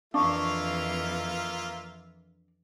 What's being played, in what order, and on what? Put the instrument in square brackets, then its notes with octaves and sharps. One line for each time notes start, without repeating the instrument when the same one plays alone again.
[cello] F2 E3 [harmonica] A#3 F4 E5 [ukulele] D4 [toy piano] F5 C#6